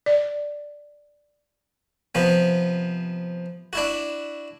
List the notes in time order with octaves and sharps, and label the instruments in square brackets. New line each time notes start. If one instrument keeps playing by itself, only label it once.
[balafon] D5
[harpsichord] C3 F3 B3
D4 E4 F#4